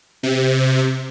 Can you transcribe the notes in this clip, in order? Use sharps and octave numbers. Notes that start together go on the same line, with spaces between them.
C3